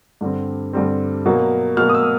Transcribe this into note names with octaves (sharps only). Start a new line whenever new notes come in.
G2 D3 G3 C4
G2 D3 G3 C4
B2 F#3 A#3
B2 F#3 A#3 F6
D#6
E6